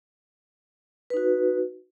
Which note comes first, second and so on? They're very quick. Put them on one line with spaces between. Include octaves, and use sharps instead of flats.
B4 D#4 F#4